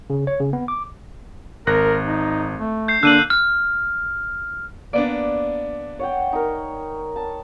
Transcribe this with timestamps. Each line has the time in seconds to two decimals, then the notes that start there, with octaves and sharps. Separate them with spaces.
0.10 C#3
0.27 C#5
0.40 C#3
0.53 B3
0.68 D6
1.67 G#1 A#4 F#6 A#6
2.06 D#4
2.59 A3
2.88 G6 C7
3.03 D3 A#3 D4 E6 F#6 D#7 F#7
3.30 F6
4.93 A#3 B3 D4 D5
5.99 C#5 F#5 G5
6.33 D#4 A#4
7.16 A5